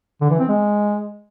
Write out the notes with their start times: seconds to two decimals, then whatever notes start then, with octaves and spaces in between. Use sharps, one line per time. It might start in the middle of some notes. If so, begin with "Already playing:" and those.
0.21 D3
0.30 E3
0.39 C4
0.49 G#3